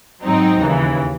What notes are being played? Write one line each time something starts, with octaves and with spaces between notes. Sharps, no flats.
G#2 F#3 C4 D#4
D#2 C#3 E3